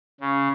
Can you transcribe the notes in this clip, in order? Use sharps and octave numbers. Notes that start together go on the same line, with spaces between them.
C#3